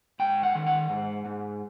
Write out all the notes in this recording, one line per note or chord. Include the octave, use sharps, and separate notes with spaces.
G#2 G5
F#5
D#3
F#5
G#2
G#2